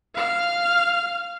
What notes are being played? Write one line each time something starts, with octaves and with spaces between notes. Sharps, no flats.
F5 F6